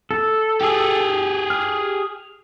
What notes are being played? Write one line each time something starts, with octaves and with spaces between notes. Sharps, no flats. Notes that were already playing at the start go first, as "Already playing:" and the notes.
A4
G4 G#4
F6